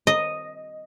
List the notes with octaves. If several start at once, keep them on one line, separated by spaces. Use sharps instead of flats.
D#5